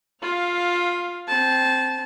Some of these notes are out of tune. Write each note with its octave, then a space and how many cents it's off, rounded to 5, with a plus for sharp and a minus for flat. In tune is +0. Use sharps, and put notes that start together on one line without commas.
F4 +15 F5 +0
C4 +0 A5 -20